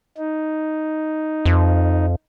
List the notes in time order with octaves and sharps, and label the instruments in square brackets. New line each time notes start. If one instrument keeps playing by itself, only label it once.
[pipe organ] D#4
[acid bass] F2